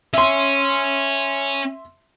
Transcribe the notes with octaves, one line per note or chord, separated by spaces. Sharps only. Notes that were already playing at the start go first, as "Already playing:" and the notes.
C#4 C#5 E5 C6